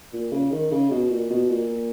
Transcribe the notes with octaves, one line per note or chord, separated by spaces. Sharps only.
A#2
C#3
D#3
C#3
B2
A#2
B2
A#2